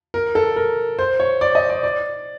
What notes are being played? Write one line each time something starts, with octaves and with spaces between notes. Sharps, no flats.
A#4
A4
A#4
C5
C#5
D5
D#5
D5
D5